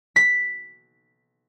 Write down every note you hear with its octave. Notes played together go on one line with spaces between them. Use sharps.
B6